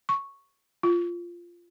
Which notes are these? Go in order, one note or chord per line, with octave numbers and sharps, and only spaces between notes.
C#6
F4